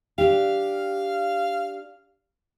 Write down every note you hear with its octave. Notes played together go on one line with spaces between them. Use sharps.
D4 G4 F5